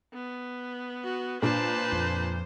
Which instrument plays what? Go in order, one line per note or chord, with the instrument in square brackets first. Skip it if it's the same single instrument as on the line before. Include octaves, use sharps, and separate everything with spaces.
[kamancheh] B3
[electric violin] F#4
[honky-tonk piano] A#2 D4 [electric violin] B4 A5 [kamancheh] C5
[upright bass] F2